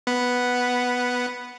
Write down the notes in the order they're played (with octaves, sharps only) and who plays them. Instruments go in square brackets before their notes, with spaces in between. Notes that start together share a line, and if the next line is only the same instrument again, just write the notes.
[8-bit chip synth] B3 F#5 B5